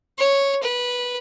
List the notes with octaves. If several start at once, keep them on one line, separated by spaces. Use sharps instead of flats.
C#5
B4